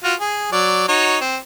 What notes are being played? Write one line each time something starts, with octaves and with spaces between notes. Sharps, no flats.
F4 F#4
G#4
F#3 D5
D#4 F#4 C#5
C4